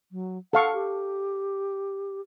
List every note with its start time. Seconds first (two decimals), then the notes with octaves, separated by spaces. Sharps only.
0.12 F#3
0.53 A4 F5 F#5 C#6
0.74 G4